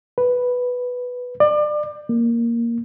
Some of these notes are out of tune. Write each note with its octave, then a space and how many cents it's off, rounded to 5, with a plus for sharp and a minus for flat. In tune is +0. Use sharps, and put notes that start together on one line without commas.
B4 +0
D5 +30
A#3 +0